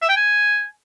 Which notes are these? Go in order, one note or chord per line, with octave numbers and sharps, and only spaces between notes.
E5
G5
G#5